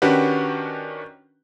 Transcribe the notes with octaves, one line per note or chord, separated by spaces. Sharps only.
D#3 C#4 D4 F#4 G4 B4